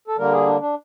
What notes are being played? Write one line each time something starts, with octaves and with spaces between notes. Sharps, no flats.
A4
D3 G3 A#3 A#4
G#4
D4
D4